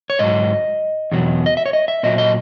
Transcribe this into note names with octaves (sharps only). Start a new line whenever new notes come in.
C#5
G#2 F#3 D#5
E2 B2 F#3
D#5
E5
C#5
D#5
E5
A#2 F#3 D#5
D#5